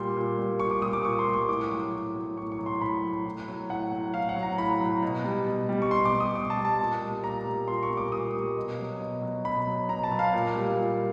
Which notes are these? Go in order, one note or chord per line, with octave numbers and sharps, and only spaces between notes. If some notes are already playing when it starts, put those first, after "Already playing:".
Already playing: A#2 G3 C6
A#2
G3
A#2 C#6
D6
G3 D#6
D6
A#2 C#6
C6
G3
C#6
A2 D6
F#3
A2
F#3
A2 C#6
C#6
F#3
C6
A2 B5
F#3
A2
F#3
A2 F#5
F#3
A2 F5
F#5
F#3
A#5
A2 B5
F#3
B2
G3
B2
G3
C#6
B2 C6
D6
G3
D#6
B2 D6
A5
G3
A5
A#2
G3
A#2 A#5
G3
A#2 C6
C#6
G3
D6
A#2 D#6
G3
B2
F#3
B2
F#3
B2 B5
F#3
B2 A#5
A5
F#3
F5
A#2
G3
A#2